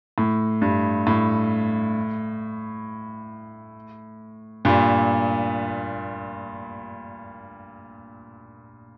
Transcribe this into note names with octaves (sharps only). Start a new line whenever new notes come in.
A2
G2
A2
G2 A#2